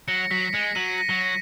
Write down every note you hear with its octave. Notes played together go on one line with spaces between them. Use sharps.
F#3 A#6 C#7
F#3 B6
G#3 A#6 C#7
F#3 B6 D#7
A#6
F#3
A#6